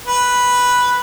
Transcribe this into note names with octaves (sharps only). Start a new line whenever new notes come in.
B4